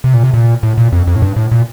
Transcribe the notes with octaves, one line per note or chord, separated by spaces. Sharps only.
C3
A#2
C3
A#2
A2
A#2
F2
F2
A2
G2
A2
A#2